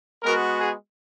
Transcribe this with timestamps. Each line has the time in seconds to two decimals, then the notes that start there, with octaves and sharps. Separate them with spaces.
0.23 G#3 B3 F#4 A#4
0.58 G#4